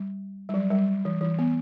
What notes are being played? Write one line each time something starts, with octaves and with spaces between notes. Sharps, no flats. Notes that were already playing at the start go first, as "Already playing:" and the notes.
Already playing: G3
G3
F#3
G3
E3
E3
B3